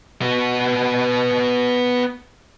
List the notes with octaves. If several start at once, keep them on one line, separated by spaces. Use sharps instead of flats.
B3 F#4